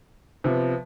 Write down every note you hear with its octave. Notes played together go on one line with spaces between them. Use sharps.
C3 F3 B3